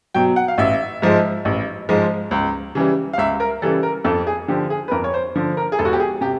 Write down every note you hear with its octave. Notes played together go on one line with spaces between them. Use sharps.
B2 F#3 G5
F#5
F5
A1 E5
G#2 F3 G#3
A1
G#2 F3 G#3
C#2
C#3 E3 G3
F5
C#2 E5
A#4
C#3 E3 G3 A4
A#4
F2 A4
G#4
D3 F3 G4
G#4
B4
F2 A#4
C#5
C5
D3 F3
A#4
G#4
E1 A4
F#4
G4
G#4
C3 G4